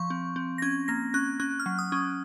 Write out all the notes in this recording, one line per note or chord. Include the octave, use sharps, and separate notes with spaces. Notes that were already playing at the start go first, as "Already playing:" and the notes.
Already playing: F3 C#6
C4
C4
A#6
C#4 G#6
A#3 A#6
C#4 F#6
C#4 F#6
F6
F#3
D#6
C#4